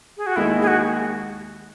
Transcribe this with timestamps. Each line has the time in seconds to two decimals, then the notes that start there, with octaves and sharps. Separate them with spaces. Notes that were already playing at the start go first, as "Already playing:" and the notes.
0.17 G#4
0.27 F#4
0.36 D#2 D#3 G#3 D#4 E4
0.62 G#4
0.67 F#4